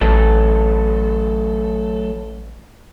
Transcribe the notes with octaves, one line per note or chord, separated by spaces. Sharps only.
A1 F#3 A3 A4